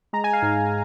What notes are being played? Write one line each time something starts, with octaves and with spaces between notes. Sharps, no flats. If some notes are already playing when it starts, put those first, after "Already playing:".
G#3 A#5
G#5
F5
G#2 G#5